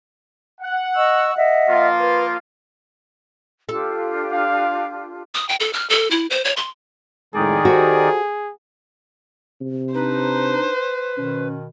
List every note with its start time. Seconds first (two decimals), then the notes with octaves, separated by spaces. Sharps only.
0.60 F#5
0.96 D#5 C#6 E6
1.36 D#5 E5 F#5
1.68 F3 A#3 F4
1.99 B4
3.69 D4 F4 G4 A4
4.32 F5
5.35 D#6
5.49 G5
5.60 A4
5.73 F6
5.90 A4
6.11 E4
6.30 C5
6.45 C#5
6.57 C6
7.34 F2 A2 D#3 G#3 D#4 G#4 D5
7.65 F#4 G4 A4 C5
9.61 C3
9.94 D4 D#4 B4 C5
11.17 B2 D#3 C#4